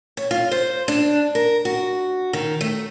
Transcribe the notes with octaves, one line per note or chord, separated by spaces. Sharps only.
C#5
F4
C5
D4
A#4
F#4
D#3
A3